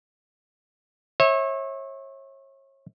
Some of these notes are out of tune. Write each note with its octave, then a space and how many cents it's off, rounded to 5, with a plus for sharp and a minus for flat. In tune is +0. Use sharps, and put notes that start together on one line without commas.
C#5 -35 E5 -20